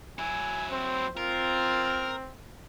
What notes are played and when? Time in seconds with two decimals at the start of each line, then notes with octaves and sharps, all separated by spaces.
0.19 F#3 E4 G#5
0.72 C4 C5
1.17 C4 F4 A#4